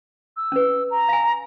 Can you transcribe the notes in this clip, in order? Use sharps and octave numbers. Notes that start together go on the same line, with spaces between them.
E6
C#4 B4
A#5
F5 G#5